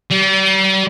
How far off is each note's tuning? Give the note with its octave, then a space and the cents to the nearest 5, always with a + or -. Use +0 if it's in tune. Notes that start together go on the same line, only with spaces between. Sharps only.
G3 -40